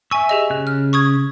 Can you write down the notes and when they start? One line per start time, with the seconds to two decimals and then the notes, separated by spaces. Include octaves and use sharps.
0.11 E5 G#5 C#6 E6
0.29 G4 G#4 D#5
0.50 C#3 F#6
0.67 F6
0.93 C#6 D#6 G#6